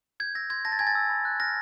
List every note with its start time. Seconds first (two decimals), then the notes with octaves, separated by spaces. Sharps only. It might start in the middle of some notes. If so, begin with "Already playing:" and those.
0.20 G6 G#6
0.35 E6 A#6
0.50 C6 G#6
0.65 A5 A#6
0.72 A6
0.79 G#5 G#6
0.87 A6
0.95 E6
1.10 B5
1.25 F#6
1.39 F6 A#6